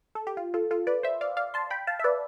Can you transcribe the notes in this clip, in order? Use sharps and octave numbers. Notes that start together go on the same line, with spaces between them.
A4
G4
F4
F4 A4
F4 A4
B4 D5
C5 E5
D5 F5
D5 F5
A5 C6
G5 B5
F5 A5
E5
B4 D5